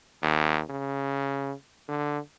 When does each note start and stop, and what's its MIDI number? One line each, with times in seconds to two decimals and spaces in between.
0.23 0.62 39
0.70 1.53 49
1.88 2.19 50